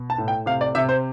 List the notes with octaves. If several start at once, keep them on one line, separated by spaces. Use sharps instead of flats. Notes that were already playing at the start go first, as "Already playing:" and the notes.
Already playing: B2
A5
A2
G5
C3 F5
D5
C3 E5
C5